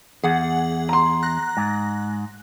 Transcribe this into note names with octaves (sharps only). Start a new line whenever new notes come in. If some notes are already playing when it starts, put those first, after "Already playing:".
E2 G#4 F#5
A#5 C6
F#6 A#6
G#2